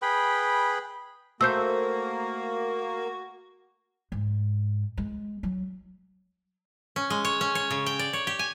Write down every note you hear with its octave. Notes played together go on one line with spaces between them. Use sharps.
G#4 B4 G5 B5
A3 A#3 F#4 C5 E6 G6
G#2
G#3
F#3
C#4
G#3
C#5
C#4
C#5
C#3
G5
D5
C#5
G4
G#5